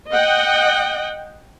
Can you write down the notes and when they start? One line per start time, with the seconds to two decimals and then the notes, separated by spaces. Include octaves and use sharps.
0.12 D#5 F#5 G5